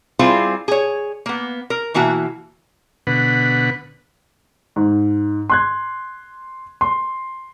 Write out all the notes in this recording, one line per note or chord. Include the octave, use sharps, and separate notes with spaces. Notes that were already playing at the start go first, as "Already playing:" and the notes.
G3 C4 E4 F4 G#4 C5
G#4 C#5
A#3 B3
A#4
B2 E3 A#3 F#4 E5
B2 D3 B4 F#5
G#2
C6 F#6 G#6
C6